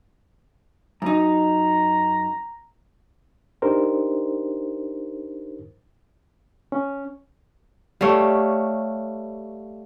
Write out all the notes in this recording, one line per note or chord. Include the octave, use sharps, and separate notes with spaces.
F#2 D#4 A#5
D4 D#4 G4 A#4 C5
C#4
G3 A3 C#5 F5